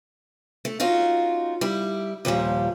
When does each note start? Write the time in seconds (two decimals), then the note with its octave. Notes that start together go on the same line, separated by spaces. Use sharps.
0.65 A3
0.80 C#4 D#4 F4 F#4
1.61 G3 E4
2.25 D#2 A#2 F3 G3